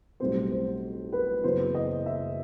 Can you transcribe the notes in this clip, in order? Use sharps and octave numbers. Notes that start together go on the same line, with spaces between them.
B1 A2 G3 C4 C5
C5
B4
F#1 F#2 E3 B3 C5
D#5
E5